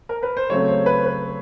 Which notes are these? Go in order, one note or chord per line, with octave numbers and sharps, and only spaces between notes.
A#4
B4
C5
C#3 F#3 A3 C4 C#5
C5
B4
B4